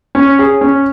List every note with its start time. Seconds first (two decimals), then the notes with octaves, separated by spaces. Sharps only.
0.15 C#4
0.39 G#4
0.61 C#4